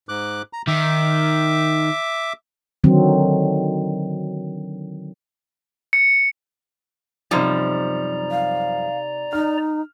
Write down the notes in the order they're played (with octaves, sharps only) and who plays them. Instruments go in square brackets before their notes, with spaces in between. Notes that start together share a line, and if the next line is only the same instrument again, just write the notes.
[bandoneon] G#2 D6 F#6
A#5
[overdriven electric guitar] D#3 [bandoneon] E5 D6
[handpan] D3 D#3 F#3 C4
[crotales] C#7
[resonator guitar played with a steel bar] F#2 F3 G3 [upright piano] C3 D#4 [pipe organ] D5 A#5
[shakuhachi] F5
[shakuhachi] D#4 [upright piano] F6